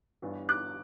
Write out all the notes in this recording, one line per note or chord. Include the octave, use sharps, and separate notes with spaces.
G1 G2 E3 B3 D4
D6 F#6